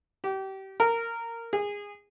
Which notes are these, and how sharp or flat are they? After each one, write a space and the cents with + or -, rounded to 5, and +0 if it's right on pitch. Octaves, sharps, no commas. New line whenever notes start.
G4 -30
A#4 -15
G#4 -20